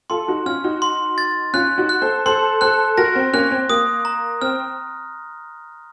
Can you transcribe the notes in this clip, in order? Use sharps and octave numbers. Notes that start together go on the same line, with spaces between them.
F4 A4 C6
D#4 F#4
C#4 F4 F6
D#4 F#4
C6
A6
C#4 F4 F#6
D#4 F#4
F#6
A4 C5
A4 C5 C6
A4 C5 F#6
F#4 A#4 A#6
C4
A#3 C#4 F#6
C4
A#3 D#6
A#5
C4 F6